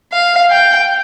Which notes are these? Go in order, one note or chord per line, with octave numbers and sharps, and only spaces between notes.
F5
G5